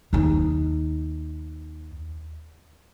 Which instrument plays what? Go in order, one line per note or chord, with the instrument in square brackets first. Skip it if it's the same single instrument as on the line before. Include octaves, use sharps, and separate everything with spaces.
[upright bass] D#2 D#4